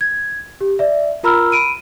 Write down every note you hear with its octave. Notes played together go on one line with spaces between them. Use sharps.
G#6
G4
D5 E5
F4 A#4 A#5 B5 E6 F6
B5 D7 D#7